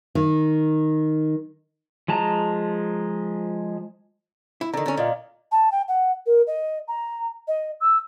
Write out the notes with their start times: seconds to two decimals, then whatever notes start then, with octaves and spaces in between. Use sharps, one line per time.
0.15 D#3
2.08 F3 G#3 A5 A#5
4.61 E4
4.74 D3 D#3 A#5
4.86 D3 C#4
4.97 A#2 D5 D#5 F5
5.51 A5
5.71 G5
5.88 F#5
6.26 A#4
6.47 D#5
6.88 A#5
7.47 D#5
7.80 E6